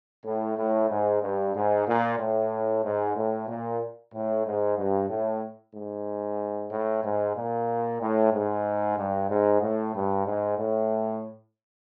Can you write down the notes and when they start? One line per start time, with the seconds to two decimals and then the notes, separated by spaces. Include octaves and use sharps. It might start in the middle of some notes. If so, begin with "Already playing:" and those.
0.25 A2
0.58 A2
0.90 G#2
1.23 G2
1.55 G#2
1.87 A#2
2.19 A2
2.83 G#2
3.16 A2
3.48 A#2
4.13 A2
4.46 G#2
4.78 G2
5.10 A2
5.75 G#2
6.72 A2
7.04 G#2
7.36 A#2
8.01 A2
8.32 G#2
8.97 G2
9.30 G#2
9.62 A2
9.95 G2
10.26 G#2
10.59 A2